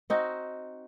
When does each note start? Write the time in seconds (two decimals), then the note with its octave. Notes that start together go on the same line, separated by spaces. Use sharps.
0.10 C4 D#4 F#4